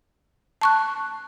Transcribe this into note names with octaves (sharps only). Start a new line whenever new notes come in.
A5 C#6 F#6